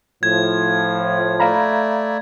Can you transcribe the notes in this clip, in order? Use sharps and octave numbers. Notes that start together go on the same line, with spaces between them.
A2 F3 G#6
A3 D5 E5 F5 A#5 B5